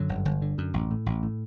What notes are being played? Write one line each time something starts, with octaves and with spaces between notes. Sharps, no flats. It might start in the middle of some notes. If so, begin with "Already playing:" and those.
Already playing: F#2 D3 F#3
G1
G1
D3
F#2
A1
A2
A1
A2